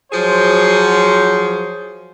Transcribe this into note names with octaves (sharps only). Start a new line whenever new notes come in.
F3 F#3 G#4 C5 C#5